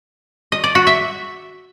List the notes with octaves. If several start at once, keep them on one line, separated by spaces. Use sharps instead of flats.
D#5
D5
F#4
E5